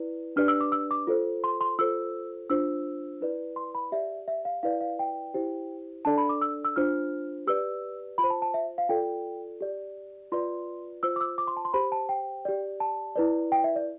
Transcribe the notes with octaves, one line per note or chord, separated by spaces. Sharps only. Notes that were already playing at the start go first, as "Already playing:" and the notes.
Already playing: E4 B4 D5
D4 G4 B4 D5 F6
E6
D6
E6
D6
F4 A4 C5
C6
C6
F4 A4 C5 E6
D4 F4 C5 E6
E4 B4 D5
C6
B5
G4 D5 E5
E5
F5
E4 B4 D5 F5
F5
G5
E4 G4 C5
D4 A4 D5 A5
B5
D6
E6
E6
D4 F4 C5 F6
G4 B4 D5 E6
F4 B5
C5
A5
A5
E5
F5
F4 A4 D5 G5
G4 D5
F4 B4 D5 C6
F4 C5 E6
D6
E6
D6
C6
A5
C6
G4 C5 B5
A5
G5
G4 D5
A5
E4 B4 D5
G5
E5
D5